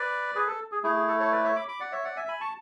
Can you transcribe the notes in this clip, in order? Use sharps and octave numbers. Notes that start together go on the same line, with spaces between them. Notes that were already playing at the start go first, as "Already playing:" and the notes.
Already playing: B4 D5
G#4 B4
A4
G#4
A3 E4 G#4
G#4
A4
A4 C#5
B4 D5
C#5 E5
B5 D6
B5 D6
D5 F#5
C#5 E5
D5 F#5
E5 G#5
G#5 B5
A5 C#6